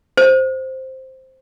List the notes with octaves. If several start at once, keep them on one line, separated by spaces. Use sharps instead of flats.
C5